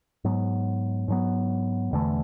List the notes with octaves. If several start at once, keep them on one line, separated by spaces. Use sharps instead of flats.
G#2 F#3 B3
G#2 F#3 B3
E1 E2 D3 A3